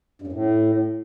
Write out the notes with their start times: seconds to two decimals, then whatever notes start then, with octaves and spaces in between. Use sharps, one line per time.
0.22 G2
0.27 F#2
0.32 A2